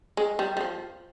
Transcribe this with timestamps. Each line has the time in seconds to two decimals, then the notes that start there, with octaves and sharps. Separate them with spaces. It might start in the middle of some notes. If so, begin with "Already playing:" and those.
0.17 G#3
0.39 G3
0.57 G3
0.61 F3